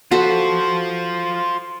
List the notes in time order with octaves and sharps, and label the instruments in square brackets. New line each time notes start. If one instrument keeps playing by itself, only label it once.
[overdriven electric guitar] F4 C5 [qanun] F#4 A4 B4